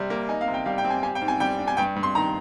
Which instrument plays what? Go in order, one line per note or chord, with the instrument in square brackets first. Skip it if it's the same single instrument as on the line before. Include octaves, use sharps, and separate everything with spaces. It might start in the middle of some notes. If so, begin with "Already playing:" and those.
Already playing: [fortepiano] C3 G3
A#3
[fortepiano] D#4 [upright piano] G#5
[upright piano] F5
[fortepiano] C3
[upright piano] G5
[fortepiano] G3 [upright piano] F5
[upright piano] G5
[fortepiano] C4
[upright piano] G#5
[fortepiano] G4 [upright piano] G#5
[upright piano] G5
[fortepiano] G#2
[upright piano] G#5
[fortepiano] G3 [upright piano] G5
[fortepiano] D4
[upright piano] G#5
[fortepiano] G2 [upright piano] G5
[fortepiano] G2
[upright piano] C6
[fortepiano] D#3 [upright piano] A#5